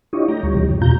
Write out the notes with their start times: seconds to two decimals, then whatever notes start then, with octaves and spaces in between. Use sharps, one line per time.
0.13 D4 E4 F4 G4 C#5 D#5
0.28 A3 G5 A#5
0.43 D2 G3 C#5
0.55 C3 E3 G3 G4
0.69 G2
0.82 E2 B2 F4 A#5 G6